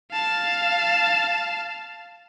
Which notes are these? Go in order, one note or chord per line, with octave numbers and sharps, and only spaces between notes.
F5 A5